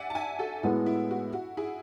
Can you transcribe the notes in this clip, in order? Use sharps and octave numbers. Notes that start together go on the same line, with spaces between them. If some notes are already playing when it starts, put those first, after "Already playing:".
Already playing: D5 E5 F#5 G#5
A5
E5 G#5
F#4 A4
A2 G#3 B3 F#4
E4
F#4
F#4
E4 G#4